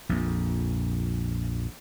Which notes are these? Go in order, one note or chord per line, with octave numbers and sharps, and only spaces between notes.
A#1 F2